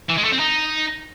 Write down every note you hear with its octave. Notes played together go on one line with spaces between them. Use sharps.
E3
G#3
A3
C4
D#4